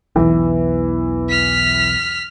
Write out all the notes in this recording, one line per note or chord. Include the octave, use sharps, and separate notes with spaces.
B1 E2 E3
F6 B6